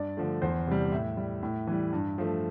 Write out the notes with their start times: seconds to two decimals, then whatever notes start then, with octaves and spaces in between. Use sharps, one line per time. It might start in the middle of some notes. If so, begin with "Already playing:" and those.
Already playing: G2 D5
0.17 D3 F3 A3
0.42 E2 C5
0.67 C3 G3
0.92 A2 E5
1.17 G3
1.43 A2
1.67 E3 G3
1.93 G2
2.18 F3 A3